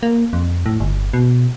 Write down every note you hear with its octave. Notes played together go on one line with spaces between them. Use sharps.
A#3
F2
A2
G1
B2